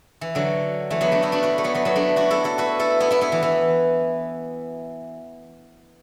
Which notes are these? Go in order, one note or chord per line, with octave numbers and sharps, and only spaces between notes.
E3
D3 F#3
E3 A3
F#3 B3
A3 D4
B3 E4
D4 F#4
F#4 B4
A3
F#3 B3
F#3 B3
F#3 B3
A3 D4
D4 F#4
E4 A4
E4 A4
F#4 B4
E4 A4
B3 E4
B3 E4
B3 E4
E3
E3